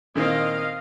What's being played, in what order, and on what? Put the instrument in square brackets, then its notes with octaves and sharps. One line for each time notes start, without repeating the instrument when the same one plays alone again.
[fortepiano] A#2 D#3 C4 [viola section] D#5 F5